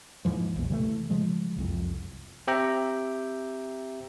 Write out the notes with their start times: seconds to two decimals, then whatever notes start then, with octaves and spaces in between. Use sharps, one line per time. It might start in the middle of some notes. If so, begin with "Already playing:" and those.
0.25 D#2 G#2 E3 F3
0.56 A#1 E2
0.70 C3 E3 F3 A3
1.10 C#3 F3 G#3
1.56 F#1 C2 F2
2.47 C4 G4 E5 G5 A#5